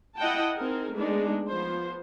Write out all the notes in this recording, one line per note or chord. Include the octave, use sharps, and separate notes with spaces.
E4 D#5 F#5 G5 A5
C4 D#4 G#4 A#4
G#3 A3 B3 D4 D#4
F3 B3 C5